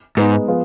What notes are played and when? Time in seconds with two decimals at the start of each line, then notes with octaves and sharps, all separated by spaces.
0.17 G#2 G#3 B3 D#4 G#4
0.48 F3 B3 F4 G#4